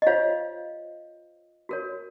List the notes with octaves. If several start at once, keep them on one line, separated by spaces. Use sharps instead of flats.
D#5
F4 C5 C#5 F5
F#4 A#4 C#5